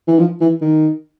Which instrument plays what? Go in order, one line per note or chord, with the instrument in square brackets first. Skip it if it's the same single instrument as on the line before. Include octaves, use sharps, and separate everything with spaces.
[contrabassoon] E3
F3
E3
D#3